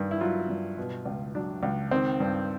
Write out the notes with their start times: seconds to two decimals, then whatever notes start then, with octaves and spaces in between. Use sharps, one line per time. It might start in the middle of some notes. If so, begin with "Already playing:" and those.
Already playing: G2 D#3
0.11 E4
0.21 F#3 F4
0.49 G2
0.78 B2
1.05 C#2
1.35 F#3 D4
1.63 C#2
1.91 D#3 C4
2.20 G2